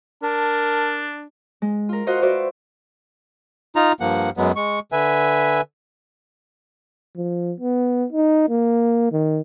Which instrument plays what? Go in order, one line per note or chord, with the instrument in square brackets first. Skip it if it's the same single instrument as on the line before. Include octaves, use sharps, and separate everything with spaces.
[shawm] D4 [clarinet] A#4 [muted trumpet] A5
[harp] G#3
F4 A#4
F4 F#4 C5 D#5 F5 F#5
F#4 B4 C5 D5 E5
[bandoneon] D#4 F4 A#5
G2 F3 A#3 F#5
F#2 F#3 G#3 B3
G#3 C#6
D3 B4 E5 G#5
[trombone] F3
B3
D#4
A#3
D#3